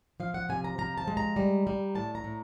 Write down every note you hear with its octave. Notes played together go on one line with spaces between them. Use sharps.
F3 F5
F#5
C3 G#5
A#5
F3 A#5
A5
G#3
A#5
G3
G3
A2 A5
A#5
A2